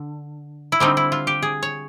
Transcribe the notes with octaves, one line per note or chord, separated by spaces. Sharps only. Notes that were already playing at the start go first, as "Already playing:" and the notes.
Already playing: D3
E4
D3 G3 C4 D#4
E4
F4
G4
G#4
C#5